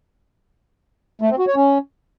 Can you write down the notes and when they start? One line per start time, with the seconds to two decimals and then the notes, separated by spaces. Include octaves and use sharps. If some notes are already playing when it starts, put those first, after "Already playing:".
1.21 A3
1.30 C4
1.39 F#4
1.47 C#5
1.56 C#4